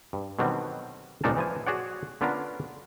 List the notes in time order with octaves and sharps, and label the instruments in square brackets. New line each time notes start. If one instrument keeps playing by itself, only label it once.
[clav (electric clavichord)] G2
B2 D3 D#3 F#3 G3 C4
C#2 A#2 D4 D#4 A#4 A5
E3 F3 G#5
F#4 G#4 C#5 D5 F#5
D3 B3 C#4 D4 F4 A#4